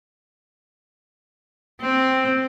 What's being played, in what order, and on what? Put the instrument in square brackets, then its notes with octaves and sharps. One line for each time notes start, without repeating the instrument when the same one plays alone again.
[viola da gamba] C4